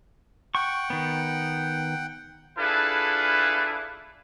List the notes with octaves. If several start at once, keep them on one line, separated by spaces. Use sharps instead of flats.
F#5 G5 C#6
D#3 B3
D4 E4 F4 G#4 A4 B4